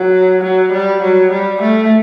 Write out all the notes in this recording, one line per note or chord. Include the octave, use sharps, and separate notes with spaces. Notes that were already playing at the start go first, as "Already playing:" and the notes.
Already playing: F#3
F#3
G3
F#3
G3
A3